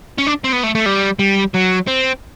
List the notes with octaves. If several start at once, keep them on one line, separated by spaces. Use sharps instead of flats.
C#4
D4
C4
B3
A3
A3
G3
G3
F#3
C4